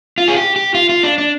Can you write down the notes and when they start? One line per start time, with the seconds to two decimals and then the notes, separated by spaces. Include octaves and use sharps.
0.18 F4
0.28 G#4
0.36 G4
0.56 G4
0.74 F4
0.89 F4
1.03 D4
1.18 D4